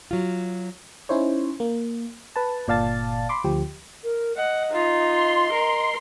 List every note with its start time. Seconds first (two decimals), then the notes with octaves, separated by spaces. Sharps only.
0.11 F#3 F4
1.09 C#4 D#4 E4 C5 C#5
1.60 A#3
2.36 B4 A5
2.67 G1 A#2 D5 F5 A5 A6
3.29 B5 C6 D6
3.44 D2 F3 G4
4.04 A#4
4.37 D#5 F#5
4.71 D#4 F4
5.08 C6
5.52 A#4